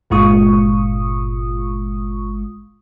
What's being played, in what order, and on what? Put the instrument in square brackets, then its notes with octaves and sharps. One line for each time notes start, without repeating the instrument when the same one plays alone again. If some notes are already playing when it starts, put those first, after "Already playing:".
[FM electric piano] G1 A#2 G#3 F4 C#6 D#6